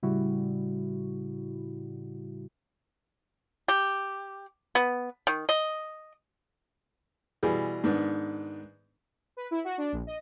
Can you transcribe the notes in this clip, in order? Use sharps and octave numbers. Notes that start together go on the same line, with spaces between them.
A2 C#3 G3 E4 F#4
G4
B3
D#3
D#5
B2 E3 G3 G#4
G#2 D#3 B3 D4
B4
E4
F#4
D4
A#1
D#5